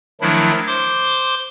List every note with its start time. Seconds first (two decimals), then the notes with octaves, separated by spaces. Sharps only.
0.21 D#3 F3 F#3 A3 D4 E4
0.67 C5 C6 D6